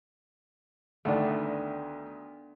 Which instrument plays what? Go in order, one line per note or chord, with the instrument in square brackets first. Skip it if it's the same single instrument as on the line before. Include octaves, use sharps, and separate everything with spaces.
[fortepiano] D2 D#3 [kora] A3 B3 D4